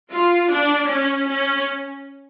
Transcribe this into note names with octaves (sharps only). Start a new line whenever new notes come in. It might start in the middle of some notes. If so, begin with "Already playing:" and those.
F4
D4
C#4
C#4